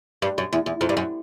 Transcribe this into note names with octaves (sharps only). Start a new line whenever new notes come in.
G2
F#2
E2
E2
F2
G2
F#2